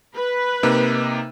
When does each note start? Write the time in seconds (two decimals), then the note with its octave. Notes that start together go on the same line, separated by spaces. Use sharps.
0.15 B4
0.63 C3 A#3 D#4